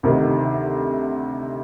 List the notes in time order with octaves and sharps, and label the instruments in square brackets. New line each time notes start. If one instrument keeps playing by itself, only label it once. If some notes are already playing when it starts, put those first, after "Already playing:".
[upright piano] D2 C3 D#3